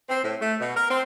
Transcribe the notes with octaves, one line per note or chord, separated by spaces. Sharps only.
C4
A2
A3
B2
A#4
C4